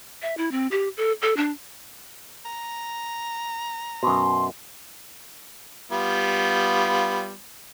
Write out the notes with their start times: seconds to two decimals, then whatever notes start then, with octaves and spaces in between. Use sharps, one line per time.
0.22 E5
0.37 E4
0.51 C4
0.71 G4
0.97 A4
1.22 A4
1.37 D4
2.45 A#5
4.03 F#2 B2 C6
5.92 G3 B3 F4